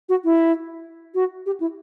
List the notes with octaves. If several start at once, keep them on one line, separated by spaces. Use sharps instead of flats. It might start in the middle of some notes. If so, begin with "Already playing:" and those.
F#4
E4
F#4
G4
E4